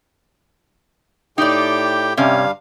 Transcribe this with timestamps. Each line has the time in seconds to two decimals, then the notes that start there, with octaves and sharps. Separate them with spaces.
1.38 A2 D#4 G4 D5 G5
2.17 G2 C3 G3 C#4 F5